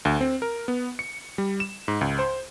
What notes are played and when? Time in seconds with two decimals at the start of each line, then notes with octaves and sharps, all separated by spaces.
0.05 D2
0.21 C4
0.42 A#4
0.68 B3
0.99 C#7
1.38 G3
1.60 E7
1.88 G#2
2.01 C#2
2.19 C5